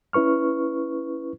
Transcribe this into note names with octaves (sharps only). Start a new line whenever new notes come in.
C#4 E4 B4 C#6 F6